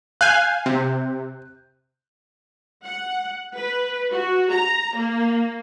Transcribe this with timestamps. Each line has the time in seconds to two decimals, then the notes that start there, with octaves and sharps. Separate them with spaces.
0.21 F5 G#5 F#6 G6
0.66 C3
2.84 F#5
3.55 B4
4.10 F#4
4.51 A#5
4.95 A#3